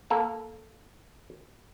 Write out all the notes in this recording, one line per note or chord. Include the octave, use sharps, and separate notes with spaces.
A#3 A4 A#4